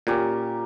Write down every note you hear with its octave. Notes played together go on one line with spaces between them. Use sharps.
A#2 C#4 G4 A#4